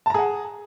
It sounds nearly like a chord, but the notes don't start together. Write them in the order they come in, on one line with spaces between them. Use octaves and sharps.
A5 A#5 G#4 F#5